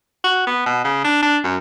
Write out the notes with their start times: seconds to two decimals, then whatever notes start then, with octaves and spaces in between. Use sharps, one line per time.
0.24 F#4
0.47 B3
0.66 B2
0.84 C#3
1.05 D4
1.23 D4
1.44 F#2